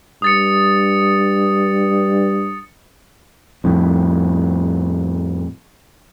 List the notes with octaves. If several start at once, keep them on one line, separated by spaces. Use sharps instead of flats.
G2 D#6 A6 C#7
F2 A2